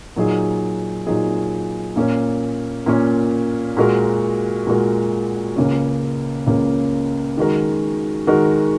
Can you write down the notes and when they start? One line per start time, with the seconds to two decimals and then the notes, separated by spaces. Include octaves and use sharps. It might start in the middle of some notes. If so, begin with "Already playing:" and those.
0.16 A#2 F#3 D#4 G#4
1.07 A#2 F#3 D#4 G#4
1.96 A#2 A#3 C#4
2.86 A#2 A#3 C#4
3.77 A#2 G#3 F#4 A#4
4.67 A#2 G#3 F#4 A#4
5.56 C#2 C#3 A#3 C#4
6.47 C#2 C#3 A#3 C#4
7.37 D#3 G#3 F#4 A#4
8.27 D#3 G#3 F#4 A#4